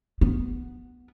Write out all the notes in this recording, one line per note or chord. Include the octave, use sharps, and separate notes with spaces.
B3